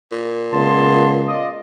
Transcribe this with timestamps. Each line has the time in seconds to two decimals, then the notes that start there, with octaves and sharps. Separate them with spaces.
0.12 A#2
0.53 C#2 C#3 B3 A5 C6
1.27 F4 D5 D#5